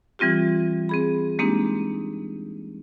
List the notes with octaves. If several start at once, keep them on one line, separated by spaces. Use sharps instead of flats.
E3 G3 C4 F4 G4
C4 G#4 B5
G#3 A#3 C4 D4 D#4 G4